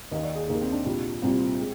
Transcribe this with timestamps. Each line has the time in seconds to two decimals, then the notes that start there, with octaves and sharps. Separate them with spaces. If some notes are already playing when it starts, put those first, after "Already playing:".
0.11 D#2 D#3 A#3 D#5
0.23 D5
0.35 G#4
0.48 D#2 D#3 A#3 G#4
0.61 C4
0.72 D4
0.85 C2 A#2 G3
1.22 C2 A#2 G3 C4
1.59 G#3